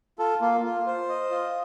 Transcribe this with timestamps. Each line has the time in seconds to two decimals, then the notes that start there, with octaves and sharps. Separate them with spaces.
0.19 F4 A4
0.41 A#3 F4
0.64 F4
0.87 C5
1.09 D#5
1.30 F4